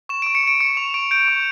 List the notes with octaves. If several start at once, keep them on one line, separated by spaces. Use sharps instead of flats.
C#6 E7
D7
C#6
C#7
C#6 D7
C#6 C#7
C#6 F7
C#6 D7
G6 D7
C#6